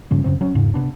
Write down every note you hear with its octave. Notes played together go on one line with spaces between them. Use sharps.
G2 C#3 F3
F#2 C#3 C4
F#3 C#4
E1 G#2 C#3
C3 B3 D4